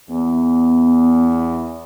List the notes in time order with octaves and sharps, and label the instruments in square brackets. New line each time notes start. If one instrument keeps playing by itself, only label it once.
[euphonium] E2 [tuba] B3